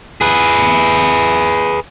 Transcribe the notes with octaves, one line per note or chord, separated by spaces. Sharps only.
G#4 B4